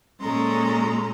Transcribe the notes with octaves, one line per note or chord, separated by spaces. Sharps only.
A#2 G#3 C#4 A4 A#5 C6